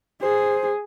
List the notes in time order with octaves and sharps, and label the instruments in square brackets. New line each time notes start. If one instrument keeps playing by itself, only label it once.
[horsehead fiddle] G#4 [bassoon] C5